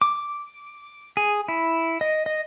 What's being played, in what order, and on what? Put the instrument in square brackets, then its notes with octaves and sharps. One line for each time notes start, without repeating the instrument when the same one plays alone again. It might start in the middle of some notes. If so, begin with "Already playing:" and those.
[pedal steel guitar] D6
G#4
E4
D#5
D#5